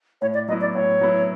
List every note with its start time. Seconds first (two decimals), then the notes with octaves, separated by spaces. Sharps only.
0.22 A2 C#5
0.34 D5
0.48 F#3 B3 E4 D#5
0.61 D5
0.75 A2 C#5
1.01 F#3 B3 E4